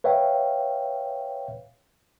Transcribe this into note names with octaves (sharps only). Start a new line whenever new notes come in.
B4 C#5 E5 F5 G5